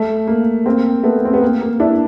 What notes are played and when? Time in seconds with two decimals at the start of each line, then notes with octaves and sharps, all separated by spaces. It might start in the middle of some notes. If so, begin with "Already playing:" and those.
Already playing: A3
0.27 A#3
0.66 A#3 C4
1.03 A3 B3
1.25 C4
1.34 B3
1.42 A#3
1.61 A#3
1.80 D4 E4